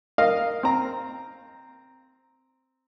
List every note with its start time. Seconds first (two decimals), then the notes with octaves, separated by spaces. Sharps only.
0.18 A#4 D#5 F5
0.63 C4 A#5